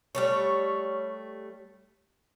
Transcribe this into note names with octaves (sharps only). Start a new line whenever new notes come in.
G3 A3 C#5